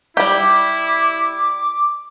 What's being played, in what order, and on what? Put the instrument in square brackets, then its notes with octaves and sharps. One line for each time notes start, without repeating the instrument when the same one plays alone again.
[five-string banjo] G3 G4 [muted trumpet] E4 [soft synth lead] D6